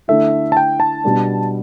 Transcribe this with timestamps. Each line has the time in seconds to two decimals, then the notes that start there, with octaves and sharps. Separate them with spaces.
0.08 D3 A3 E4 E5
0.52 A5
0.57 G5
0.80 A5
1.04 B2 G3 D4